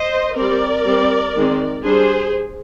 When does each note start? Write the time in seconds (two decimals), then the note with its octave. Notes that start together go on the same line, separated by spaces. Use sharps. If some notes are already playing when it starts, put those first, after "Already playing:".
Already playing: C5 D#5
0.36 G3 C4 A#4 D5
0.85 G3 C4
1.36 D#3 G#3 C4
1.84 G3 D4 G#4 C5